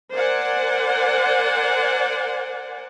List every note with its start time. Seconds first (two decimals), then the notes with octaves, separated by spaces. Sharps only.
0.14 A#4 C5 D5 F#5 G#5